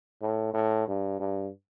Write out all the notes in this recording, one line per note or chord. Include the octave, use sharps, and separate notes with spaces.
A2
A2
G2
G2